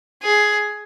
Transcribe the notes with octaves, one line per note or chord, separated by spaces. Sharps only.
G#4